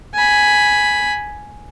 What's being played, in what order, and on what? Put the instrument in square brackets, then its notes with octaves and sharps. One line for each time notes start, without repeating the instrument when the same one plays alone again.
[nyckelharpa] G#5 B5